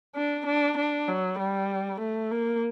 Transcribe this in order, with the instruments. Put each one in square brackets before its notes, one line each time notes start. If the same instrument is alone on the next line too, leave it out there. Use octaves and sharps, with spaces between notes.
[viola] D4
D4
D4
F#3
G3
A3
A#3